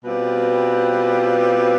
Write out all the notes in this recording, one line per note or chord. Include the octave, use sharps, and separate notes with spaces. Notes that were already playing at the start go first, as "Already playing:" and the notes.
B2 G3 C4 F4 B4